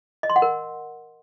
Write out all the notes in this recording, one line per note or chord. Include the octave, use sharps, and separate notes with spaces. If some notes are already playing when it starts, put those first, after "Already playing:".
D#5
C6
F#5
A#4